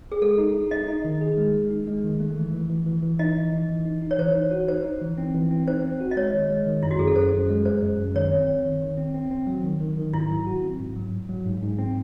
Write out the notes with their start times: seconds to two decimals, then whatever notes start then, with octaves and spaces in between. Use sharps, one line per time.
0.12 G#4
0.22 G#3 A4
0.38 D#4
0.54 D#4
0.71 D#4 D#5
0.88 D#4
1.04 D#3
1.21 G#4
1.37 G#3
1.54 G#3
1.71 D#4
1.87 G#3
2.04 D#3
2.20 A3
2.37 E3
2.53 E3
2.69 E3
2.86 E3
3.03 E3
3.19 D#4 D#5
3.36 E3
3.52 E3
3.69 E3
3.86 D#4
4.02 D#4
4.11 C#5
4.18 E3 C5
4.35 D#4
4.51 F#4
4.68 D#4 C5
4.84 D#4
5.01 E3
5.18 C4
5.34 E3
5.51 C4
5.67 D#4 C5
5.84 C4
6.00 F#4
6.11 D#5
6.16 G#3 C#5
6.33 D#3
6.50 G#3
6.66 D#3
6.83 F#2 E4
6.91 F#4
6.99 F#2 G#4
7.07 A4
7.16 F#2 C5
7.33 F#2
7.49 G#3
7.65 G#3 C5
7.82 F#2
7.98 F#2
8.15 D#3 C#5
8.32 C4
8.48 C4
8.65 D#3
8.81 D#3
8.98 C4
9.14 C4
9.31 C4
9.47 F#3
9.64 D#3
9.80 D#3
9.97 D#3
10.13 G#2 E4
10.30 F#3
10.47 F#4
10.63 C4
10.79 G#2
10.96 F#3
11.12 G#2
11.29 F#3
11.45 G#2
11.62 G#2
11.79 C4